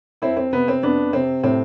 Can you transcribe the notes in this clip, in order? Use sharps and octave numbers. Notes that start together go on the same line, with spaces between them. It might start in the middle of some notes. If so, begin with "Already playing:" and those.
F2 C4 E4
C4
C3 B3
C4
F2 B3 D4
C3 C4
A2 C4